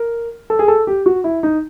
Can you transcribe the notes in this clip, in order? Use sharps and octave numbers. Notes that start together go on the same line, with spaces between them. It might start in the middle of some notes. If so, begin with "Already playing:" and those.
Already playing: A#4
A4
G#4
A4
G4
F#4
E4
D#4